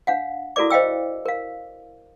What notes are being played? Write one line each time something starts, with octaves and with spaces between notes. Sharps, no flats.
D4 F5 F#5
E4 F#4 A4 A#4 D5 D6
C5 D#5 F5 G5 E6
A#4 F5